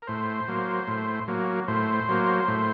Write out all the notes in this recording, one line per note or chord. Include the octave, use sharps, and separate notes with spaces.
A#4
A2 C5
F#3 A#3
A2
F#3 A#3
A2 C5
F#3 A#3
A2